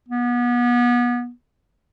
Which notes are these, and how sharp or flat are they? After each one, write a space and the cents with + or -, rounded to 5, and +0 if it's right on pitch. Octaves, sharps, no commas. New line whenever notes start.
B3 -30